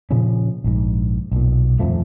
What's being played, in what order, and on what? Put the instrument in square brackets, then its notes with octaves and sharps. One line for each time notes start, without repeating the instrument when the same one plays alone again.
[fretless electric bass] A#2 C#3 F3 C#4
A#1 G#2
B1 A#2
D#1 F2 F3 A3